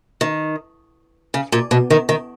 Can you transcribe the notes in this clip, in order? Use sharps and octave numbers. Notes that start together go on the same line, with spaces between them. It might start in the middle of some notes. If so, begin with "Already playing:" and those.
D#3
C#3
A#2
B2
D#3
D#3